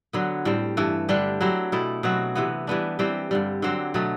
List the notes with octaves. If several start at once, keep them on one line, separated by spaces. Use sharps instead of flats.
D3 F#3 B3
A2 G3 C4
G2 E3 A3
D3 G3 D4 G4
F#3 C4 E4 G4
B2 A3 E4
B2 F#3 C4 F#4
C3 E3 B3
E3 G3 B3 D4
E3 G3 C4 G4
G2 D3 G3
D3 F#3 C4 G4
B2 F#3 A3